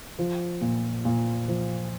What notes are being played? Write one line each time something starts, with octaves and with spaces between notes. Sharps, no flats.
F3
A#2
A#2
F3